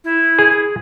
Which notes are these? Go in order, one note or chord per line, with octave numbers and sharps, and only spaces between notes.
E4
G#4